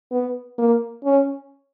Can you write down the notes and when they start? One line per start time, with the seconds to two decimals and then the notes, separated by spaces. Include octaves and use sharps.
0.11 B3
0.58 A#3
1.04 C#4